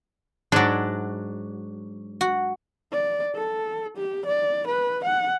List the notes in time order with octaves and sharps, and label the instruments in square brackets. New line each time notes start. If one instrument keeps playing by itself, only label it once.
[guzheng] G#2 D5 [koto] F#3 D4
[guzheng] F#4
[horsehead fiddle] D5
A4
G4
D5
B4
F#5